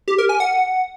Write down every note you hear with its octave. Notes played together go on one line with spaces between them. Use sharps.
G4
A#4
G#5
F#5